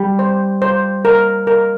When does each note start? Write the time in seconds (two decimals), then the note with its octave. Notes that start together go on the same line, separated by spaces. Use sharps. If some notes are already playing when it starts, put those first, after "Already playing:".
Already playing: G3
0.19 C5
0.62 C5
1.05 A#4
1.47 A#4